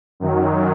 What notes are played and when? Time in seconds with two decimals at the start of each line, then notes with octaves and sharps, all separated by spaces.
0.20 F#2 D#3 F#3